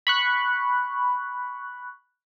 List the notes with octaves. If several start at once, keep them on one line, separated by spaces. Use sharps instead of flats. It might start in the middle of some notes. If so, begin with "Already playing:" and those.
B5 C#6 F#6